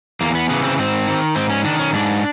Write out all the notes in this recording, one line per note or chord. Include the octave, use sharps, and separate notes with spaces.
E2 A#3
B3
C#3 E3 B3
C4
G#2 C4
D#3
G#2 C4
C#4
D#3 D4
C#4
G#2 D4